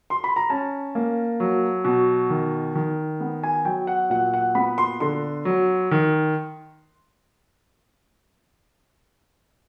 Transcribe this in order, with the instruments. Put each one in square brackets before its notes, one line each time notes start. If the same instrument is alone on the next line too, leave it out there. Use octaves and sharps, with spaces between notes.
[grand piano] C6
B5
A#5
C#4 A5
A#3
F#3
B2
D#3
D#3
B3
G#5
F#3 G5
F#5
A#2 F#5
F#5
B3 B5
C6
D3 C6
F#3
D#3